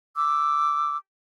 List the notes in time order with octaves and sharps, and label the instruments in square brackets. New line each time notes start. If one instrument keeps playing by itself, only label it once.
[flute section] D6 E6